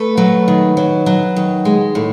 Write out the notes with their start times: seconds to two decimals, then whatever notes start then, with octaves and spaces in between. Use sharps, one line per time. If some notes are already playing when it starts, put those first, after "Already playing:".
Already playing: A3 B4
0.17 F#3
0.48 D#3
0.77 F#3
1.06 F#3
1.36 D#3
1.65 G#3
1.95 A2